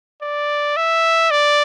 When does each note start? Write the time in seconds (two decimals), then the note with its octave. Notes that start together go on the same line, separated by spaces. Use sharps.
0.22 D5
0.76 E5
1.31 D5